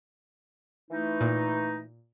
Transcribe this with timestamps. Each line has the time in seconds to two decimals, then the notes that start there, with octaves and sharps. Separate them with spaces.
0.90 E3 A3 D#4
1.21 A#2